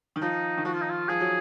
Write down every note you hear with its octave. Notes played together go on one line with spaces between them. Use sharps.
D#3
F3 D#4
D#3
F3 F#4
F4
D#4
F4
F3 G#4
F#3